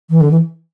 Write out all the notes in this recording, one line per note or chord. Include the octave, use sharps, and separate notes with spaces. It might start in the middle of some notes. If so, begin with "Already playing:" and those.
E3
D3
E3